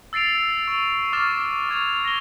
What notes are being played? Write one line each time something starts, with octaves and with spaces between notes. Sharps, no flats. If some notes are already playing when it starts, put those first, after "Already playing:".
E6 A6 C7 D7 F7
C#6 F7
C#6 D6 F6 A6 E7
C#6 G#6 F7
A#6 G7